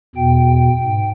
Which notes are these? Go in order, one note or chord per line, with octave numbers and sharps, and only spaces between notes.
E2 B2 G5
G#2